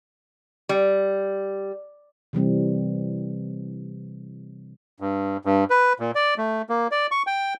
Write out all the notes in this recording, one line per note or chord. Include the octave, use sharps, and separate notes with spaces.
G3
C3 E3 G3 C4
G2
G2
B4
A#2
D5
A3
A#3
D5
C#6
G5